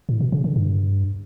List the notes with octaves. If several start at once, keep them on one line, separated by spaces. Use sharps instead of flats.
A2
B2
C#3
D3
G2